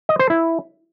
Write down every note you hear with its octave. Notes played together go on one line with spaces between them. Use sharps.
D#5
C5
E4